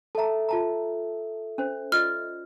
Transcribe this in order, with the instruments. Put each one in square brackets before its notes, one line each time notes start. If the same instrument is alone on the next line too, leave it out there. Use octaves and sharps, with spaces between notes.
[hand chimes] A4 E5 [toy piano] A5 A#5
[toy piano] F4 A5 A#5
C#4 C5
[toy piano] F4 D5 D#5 [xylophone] F6